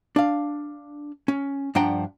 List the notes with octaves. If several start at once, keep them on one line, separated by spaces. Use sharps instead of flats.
D4 F5
C#4
G2 F3 D4 F#5 G5 A#5